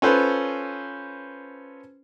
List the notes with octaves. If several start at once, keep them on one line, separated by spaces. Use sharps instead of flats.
C#4 F4 A4 B4 C5